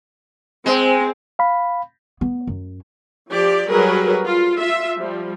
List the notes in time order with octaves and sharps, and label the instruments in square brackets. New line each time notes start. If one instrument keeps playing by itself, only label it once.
[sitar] G#3 [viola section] C4
[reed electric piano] F5 B5
[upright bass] B3
F#2
[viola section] F3 G4 D5
F#3 G3 G#4 A#4 B4
F4
F4 E5
F3 G3